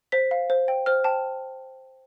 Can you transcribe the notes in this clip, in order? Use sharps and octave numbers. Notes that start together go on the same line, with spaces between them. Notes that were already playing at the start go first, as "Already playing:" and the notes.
C5 B6
F5
C5
G5
C5 F6
G5 A5